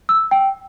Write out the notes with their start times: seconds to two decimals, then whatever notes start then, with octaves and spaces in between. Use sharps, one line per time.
0.09 E6
0.31 G5